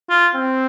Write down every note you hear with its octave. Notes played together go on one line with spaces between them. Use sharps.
F4
C4